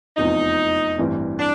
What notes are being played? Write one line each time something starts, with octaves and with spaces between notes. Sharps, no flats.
F1 E2 C3 F3 D#4
A1 G2 E3 G3 C4
D4